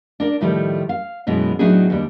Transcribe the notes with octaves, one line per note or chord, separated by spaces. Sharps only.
D4 A#4 D5
A2 D#3 F3 G3 A3
F5
F#2 B2 E3 G#3
A2 F#3 B3 D4 D#4 G#4
D#2 G3 D4